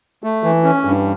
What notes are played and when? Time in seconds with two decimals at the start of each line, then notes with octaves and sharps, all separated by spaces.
0.24 A3
0.44 E3
0.64 C#4
0.85 G2